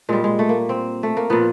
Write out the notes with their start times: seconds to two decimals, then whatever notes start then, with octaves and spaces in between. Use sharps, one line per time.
0.09 A#2 G3 G#3
0.24 G#3
0.39 A3
0.49 A#3
0.69 C4
1.03 A3
1.17 A#3
1.30 A#2 F3 B3